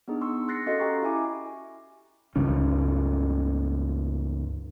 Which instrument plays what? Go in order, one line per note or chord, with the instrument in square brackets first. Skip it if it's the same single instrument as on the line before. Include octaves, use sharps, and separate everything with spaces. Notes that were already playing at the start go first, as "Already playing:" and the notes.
[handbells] B3 D4 D#4 G#4
C6 C#6 E6
C6 F#6 A6 A#6 C7 C#7
C#4 F#4 A4 D#5 F5 C6
C#4 G4 G5 A#5 C#6
E4 E5 G#5 D6
[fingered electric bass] C#2 G2 C#3 C#4